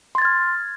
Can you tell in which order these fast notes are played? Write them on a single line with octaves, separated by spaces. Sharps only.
C6 A6 G#6 F6